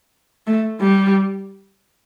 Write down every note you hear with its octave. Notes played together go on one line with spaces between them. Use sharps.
A3
G3